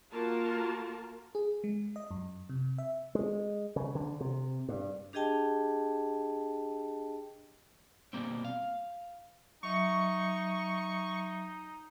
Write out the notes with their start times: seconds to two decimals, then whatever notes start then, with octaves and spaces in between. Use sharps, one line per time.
0.12 A#3 F4 F#4 A#4 A5
1.35 G#4
1.64 G#3
1.96 D#5
2.11 F#2
2.49 C3
2.78 E5
3.15 G#3
3.76 C#3
3.95 D3
4.21 C3
4.69 G2
5.13 D4 G4 G#4 D#5 G5 A5
8.13 B2 F3 G3 A#3 C4
8.44 F5
9.63 F#3 D#4 D#5 E5 C#6